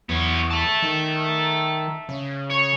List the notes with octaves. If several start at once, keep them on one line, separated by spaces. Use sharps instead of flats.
E2 B3 C#5
E5 A5
D#3
C#3
C#5